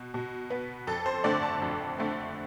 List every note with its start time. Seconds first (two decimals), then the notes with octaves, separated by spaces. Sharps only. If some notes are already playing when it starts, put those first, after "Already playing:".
Already playing: B2
0.14 B2
0.50 B3
0.87 F2 A4
1.06 C5
1.24 D3 A3 C4 D5
1.43 A5
1.62 F2
1.98 D3 A3 C4